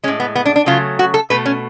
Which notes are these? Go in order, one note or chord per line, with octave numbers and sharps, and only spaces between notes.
A2 G#3 C#4
B3
B3
D4
D4
C#3 F#3 A3 F4
F#4
A4
B2 A3 B4
C#4